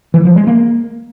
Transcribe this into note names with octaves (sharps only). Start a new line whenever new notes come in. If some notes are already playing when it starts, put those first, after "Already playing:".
E3
F3
G#3
A#3